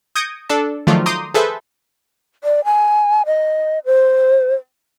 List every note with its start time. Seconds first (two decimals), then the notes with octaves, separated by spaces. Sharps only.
0.16 D#6 G6 G#6 A#6 C#7 D7
0.49 D4 A4 A5
0.87 D#3 F3 F#3 A3 F4 D5
1.06 A#5 C6 D6 D#6 G6
1.34 G#4 A4 B4 C5 E5
2.44 D5
2.65 G#5
3.26 D#5
3.86 C5